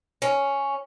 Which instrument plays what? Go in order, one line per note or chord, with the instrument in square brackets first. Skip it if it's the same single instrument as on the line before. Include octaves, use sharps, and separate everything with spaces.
[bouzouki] C#4